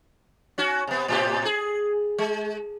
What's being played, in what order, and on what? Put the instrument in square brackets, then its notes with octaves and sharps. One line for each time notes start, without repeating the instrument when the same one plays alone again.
[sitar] C#4 F#4
C3 B3
A2 C3 G4
G#4
G#3